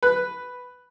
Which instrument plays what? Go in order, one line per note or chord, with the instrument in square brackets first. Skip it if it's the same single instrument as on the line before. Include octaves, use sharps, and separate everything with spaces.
[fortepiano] B4